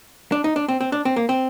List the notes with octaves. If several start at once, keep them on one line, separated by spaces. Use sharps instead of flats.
D4
D#4
D4
C4
C4
D4
C4
A#3
C4